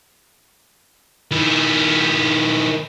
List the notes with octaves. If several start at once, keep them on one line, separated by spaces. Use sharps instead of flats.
D#3 E4